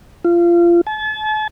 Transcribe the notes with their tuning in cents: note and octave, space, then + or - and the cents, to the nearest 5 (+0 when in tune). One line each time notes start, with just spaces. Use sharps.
F4 -25
A5 -40